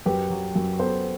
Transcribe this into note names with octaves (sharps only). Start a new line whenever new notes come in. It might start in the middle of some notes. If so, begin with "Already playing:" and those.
F#2 G4 B4
F#3
F#2
B3 A4 C5